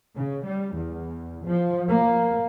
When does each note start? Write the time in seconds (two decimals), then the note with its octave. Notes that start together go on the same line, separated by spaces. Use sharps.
0.14 C#3
0.44 G3
0.74 E2
1.44 F3
1.89 A#3